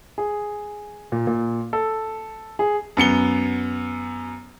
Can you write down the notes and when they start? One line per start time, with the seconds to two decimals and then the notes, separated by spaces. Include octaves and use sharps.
0.18 G#4
1.12 A#2
1.27 A#2
1.73 A4
2.59 G#4
2.97 F#2 B3 C#7 G7